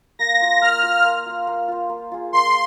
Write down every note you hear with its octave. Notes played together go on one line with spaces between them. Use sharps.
A#3 A#6
F4 C5
A#3 F6
F4 C5
A#3
F4 C5
A#3
F4 C5
A#3
F4 G#4
A#3 C6